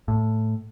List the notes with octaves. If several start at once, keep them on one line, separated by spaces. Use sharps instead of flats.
A2